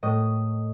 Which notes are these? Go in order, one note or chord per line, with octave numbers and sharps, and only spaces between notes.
A2 D#5